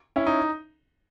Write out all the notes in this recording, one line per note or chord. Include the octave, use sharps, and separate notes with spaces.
C#4 E4
D#4